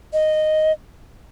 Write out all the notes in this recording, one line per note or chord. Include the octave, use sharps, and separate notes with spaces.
D#5